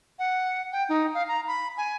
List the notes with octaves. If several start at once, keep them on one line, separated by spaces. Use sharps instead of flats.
F#5
G5
D#4
F5
A#5
B5
G#5